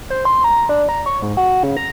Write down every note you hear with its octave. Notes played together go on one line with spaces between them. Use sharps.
C5
C6
A#5
D4
A#5
C#5
G#2
F#4
C#3
A#5